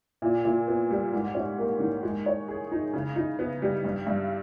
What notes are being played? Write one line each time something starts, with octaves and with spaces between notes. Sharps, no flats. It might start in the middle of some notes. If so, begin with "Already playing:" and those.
A#2
A#2
B3
G3
G#2
C#4
A#3
D#3
G#3
C#5
G#4
D#4
C#3
D#4
B3
G3
G2
G2